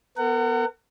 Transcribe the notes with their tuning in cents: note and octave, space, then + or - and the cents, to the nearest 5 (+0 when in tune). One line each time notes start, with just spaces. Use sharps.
B3 +0 A#4 -35 F#5 +20